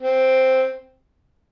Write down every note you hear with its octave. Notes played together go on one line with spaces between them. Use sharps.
C4